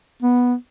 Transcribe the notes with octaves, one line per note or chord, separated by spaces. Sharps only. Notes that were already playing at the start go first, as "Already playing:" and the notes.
B3